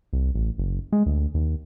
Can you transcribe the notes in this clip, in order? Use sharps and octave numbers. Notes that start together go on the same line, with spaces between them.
C2
A1
F#1
G#3
D2
D#2